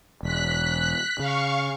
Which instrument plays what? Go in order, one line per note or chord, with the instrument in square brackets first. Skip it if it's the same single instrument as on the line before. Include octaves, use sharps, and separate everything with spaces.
[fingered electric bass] E1 [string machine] F#6 B6
[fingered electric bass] C#3 [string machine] F5 C#6